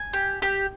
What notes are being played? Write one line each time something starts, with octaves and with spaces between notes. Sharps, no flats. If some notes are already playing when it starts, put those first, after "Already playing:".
Already playing: G#5
G4
G4